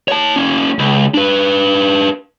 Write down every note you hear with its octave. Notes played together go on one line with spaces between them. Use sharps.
C#5 A5
A#3 C#4
C#2
D4 B4